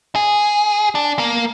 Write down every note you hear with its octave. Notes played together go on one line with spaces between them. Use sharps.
G#4
D4
A#3